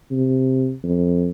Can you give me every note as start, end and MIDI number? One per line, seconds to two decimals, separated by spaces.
0.11 0.73 48
0.83 1.31 41